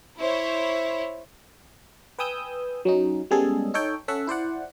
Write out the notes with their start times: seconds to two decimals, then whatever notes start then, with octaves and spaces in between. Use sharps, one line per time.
0.19 E4 C5 C#5
2.18 B4 G5 G#5 D#6 E6 G6
2.85 F#3 C#4 D#4
3.31 G3 G#3 B3 C#4 G#4 A4
3.74 D#4 A4 C#5 G5
4.08 C#4 A4 E5 F#5
4.27 E4 C5 D5 F#5